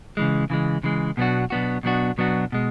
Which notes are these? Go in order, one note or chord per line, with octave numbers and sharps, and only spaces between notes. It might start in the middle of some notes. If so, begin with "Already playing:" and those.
C#3 E3 G#3
C#3 E3 G#3
C#3 E3 G#3
B2 F#3 B3 D4 F#4
B2 F#3 B3 D4 F#4
B2 F#3 B3 D4 F#4
B2 F#3 B3 D4 F#4
B2 G#3